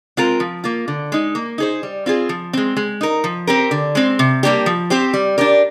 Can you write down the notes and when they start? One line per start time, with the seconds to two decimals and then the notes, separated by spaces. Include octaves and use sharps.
0.17 G#3 C4 F4 A#4
0.40 F3
0.64 A#3 F4
0.88 D3
1.12 G#3 D#4
1.35 A#3
1.58 D#4 G#4 C5
1.83 G3
2.06 C4 F4 G#4
2.29 F3
2.53 G#3 C4
2.77 G#3
3.01 D#4 A#4
3.24 F3
3.47 C4 G4 A#4
3.71 D3
3.95 G#3 C4
4.19 C3
4.43 G3 A#3 D4 G4
4.66 F3
4.90 C4 G4 C5
5.14 G3
5.38 D4 G4 A#4